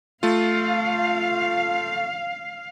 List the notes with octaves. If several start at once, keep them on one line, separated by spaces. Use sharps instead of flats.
A3 F4 F5